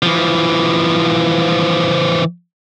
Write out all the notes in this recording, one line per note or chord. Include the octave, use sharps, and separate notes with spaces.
E3 F3